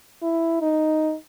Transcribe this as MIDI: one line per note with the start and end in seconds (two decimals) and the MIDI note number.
0.22 0.60 64
0.62 1.15 63